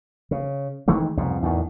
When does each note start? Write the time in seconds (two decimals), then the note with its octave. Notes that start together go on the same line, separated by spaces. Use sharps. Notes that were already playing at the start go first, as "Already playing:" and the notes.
0.31 C#3
0.88 D#3 E3 G#3 A3
1.17 C2 F2 G#2 B2
1.42 E2 A2 C3 D#3